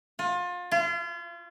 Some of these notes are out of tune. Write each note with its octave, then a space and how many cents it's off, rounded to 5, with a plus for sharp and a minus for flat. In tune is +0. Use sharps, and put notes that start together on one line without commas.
F4 +30
F4 -35